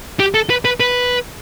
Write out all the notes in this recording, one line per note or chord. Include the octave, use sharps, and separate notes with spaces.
G4
A4
B4
B4
B4